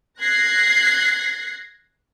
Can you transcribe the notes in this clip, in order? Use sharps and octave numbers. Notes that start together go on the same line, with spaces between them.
F#6 G#6 A#6 C7